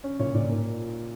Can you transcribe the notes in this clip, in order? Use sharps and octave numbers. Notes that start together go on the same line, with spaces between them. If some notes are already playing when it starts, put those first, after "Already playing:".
C#4
A#2 C#5
A#2 D5
A#3